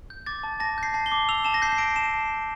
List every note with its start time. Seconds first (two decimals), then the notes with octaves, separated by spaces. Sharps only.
0.10 G6
0.26 D6 A6
0.43 A5
0.60 A5 A#6
0.78 G6
0.83 C7
0.94 A5
1.06 G7
1.12 D6
1.29 E6 F7
1.45 A5 E7
1.54 A#6
1.62 G6 C7
1.72 C7
1.78 E6 D7
1.96 A5 E7